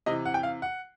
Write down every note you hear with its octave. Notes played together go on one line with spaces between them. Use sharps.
C3 E3 D#5
F#5
G5
F5
F#5